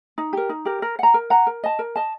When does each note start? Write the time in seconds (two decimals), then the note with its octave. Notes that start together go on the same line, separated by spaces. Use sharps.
0.18 D#4
0.33 G4 A#4
0.49 D#4
0.65 G4 A#4
0.82 A#4
0.99 F#5 A#5
1.14 A#4
1.30 F#5 A#5
1.47 A#4
1.64 D#5 A5
1.79 A#4
1.96 D#5 A5